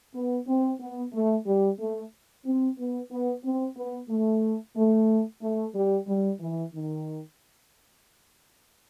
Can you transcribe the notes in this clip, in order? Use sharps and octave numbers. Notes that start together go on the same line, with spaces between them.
B3
C4
B3
A3
G3
A3
C4
B3
B3
C4
B3
A3
A3
A3
G3
G3
E3
D#3